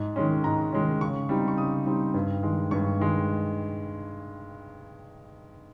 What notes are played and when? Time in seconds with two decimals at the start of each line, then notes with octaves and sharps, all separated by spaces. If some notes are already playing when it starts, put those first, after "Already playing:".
Already playing: G#2
0.16 D#3 G#3 C#4
0.44 G#2 A#5
0.72 D#3 G#3 C#4
1.01 C#3 C#6
1.29 G3 C4 D#4
1.48 C#6
1.57 C#3 D#6
1.86 G3 C4 D#4
2.14 G2
2.43 D#3 G#3
2.71 G2 C#6
3.00 D#3 G#3